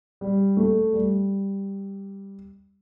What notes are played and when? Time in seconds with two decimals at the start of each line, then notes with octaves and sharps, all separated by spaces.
0.21 G3
0.57 A3
0.93 G3